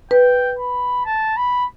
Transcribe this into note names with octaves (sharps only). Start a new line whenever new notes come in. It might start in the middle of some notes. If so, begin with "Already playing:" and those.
B4 G5
B5
A5
B5